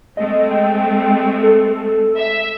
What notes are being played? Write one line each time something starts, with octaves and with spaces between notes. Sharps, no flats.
G#3 A3 C4 D#5
G5
A4
E5